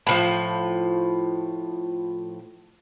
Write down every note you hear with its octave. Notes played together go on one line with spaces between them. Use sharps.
A2 D#3 F3